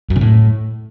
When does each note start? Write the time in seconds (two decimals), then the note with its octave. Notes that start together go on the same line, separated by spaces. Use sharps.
0.10 F#2
0.15 C#3
0.21 A2